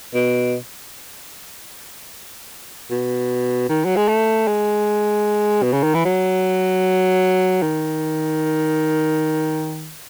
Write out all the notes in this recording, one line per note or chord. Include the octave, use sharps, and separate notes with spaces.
B2
B2
D#3
F#3
G#3
A3
G#3
B2
C#3
D#3
E3
F#3
D#3